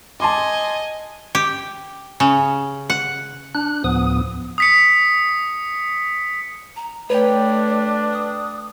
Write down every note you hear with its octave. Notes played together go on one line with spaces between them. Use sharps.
D#5 G#5 A5 C6 D6
G4
C#3
F#5
D4 F#6
D2 A2 F3 B3 D#6
D#6 B6 C#7
A#5
A3 D4 B4 C#5 G5
D#6